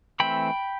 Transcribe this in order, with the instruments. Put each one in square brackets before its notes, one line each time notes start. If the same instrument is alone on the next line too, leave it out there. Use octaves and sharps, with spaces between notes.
[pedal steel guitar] E3 A3 C4 G5 B5